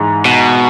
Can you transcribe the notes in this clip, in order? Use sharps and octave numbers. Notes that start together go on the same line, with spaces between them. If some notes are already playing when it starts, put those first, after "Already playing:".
Already playing: G#2 E3 G#3
B2